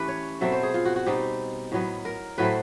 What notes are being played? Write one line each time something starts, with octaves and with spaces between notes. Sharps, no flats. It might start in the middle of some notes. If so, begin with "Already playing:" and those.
Already playing: E3 A3 C#4 G4 B4
C#5
B2 F#3 A3 C4 E5
C5
G#4
F4
F#4
F#4
B2 G3 C4 D#4 G4
A2 F#3 B3
A#4
A2 F#3 A3 C4 B4